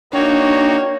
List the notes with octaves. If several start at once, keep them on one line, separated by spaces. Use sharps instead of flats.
A#3 D4 D#4 F#4 C#5 G5